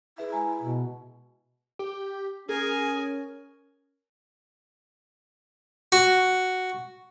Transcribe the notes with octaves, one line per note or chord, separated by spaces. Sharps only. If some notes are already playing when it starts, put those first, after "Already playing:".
E4 G#4 B4 E5
G#3 G#5 A#5
B2
G4
C#4 G#4 A#4 G#5
F#4